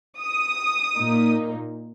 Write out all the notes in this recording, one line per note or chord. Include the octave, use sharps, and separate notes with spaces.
D#6
A#2 A#3 D#4